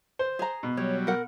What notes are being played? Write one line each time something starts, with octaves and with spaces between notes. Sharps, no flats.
C5
G#4 A#5
B2
F#3 G3 C#5
A#4 F#5